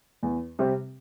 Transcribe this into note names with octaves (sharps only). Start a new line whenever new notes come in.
E2
C3 G3 C4 G4